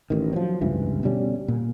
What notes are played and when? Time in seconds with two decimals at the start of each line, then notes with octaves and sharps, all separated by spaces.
0.10 A1 D#3
0.33 F3 F#3 C4
0.61 F1 C#2 G2 E3
1.03 B2 D3 G3 C#4
1.48 A#2